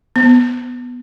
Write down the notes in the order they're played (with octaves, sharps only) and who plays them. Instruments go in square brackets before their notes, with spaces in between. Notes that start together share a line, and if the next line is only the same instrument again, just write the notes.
[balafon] B3